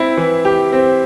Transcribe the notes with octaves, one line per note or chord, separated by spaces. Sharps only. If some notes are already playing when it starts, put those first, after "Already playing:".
Already playing: C4 E4
E3
G4
C4